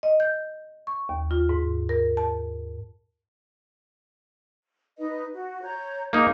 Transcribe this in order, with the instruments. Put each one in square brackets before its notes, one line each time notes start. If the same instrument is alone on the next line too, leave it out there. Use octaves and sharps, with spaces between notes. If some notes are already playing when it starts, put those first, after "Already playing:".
[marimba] D#5
G6
C#6
D#2
F4
G#2
A#4
A5
[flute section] D#4 B4 D#5
F#4
C#5 A#5 G6
[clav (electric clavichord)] A#3 D#4 [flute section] G#4 A#5